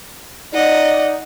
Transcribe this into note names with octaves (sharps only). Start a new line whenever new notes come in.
D#4 D5 D#5 F#5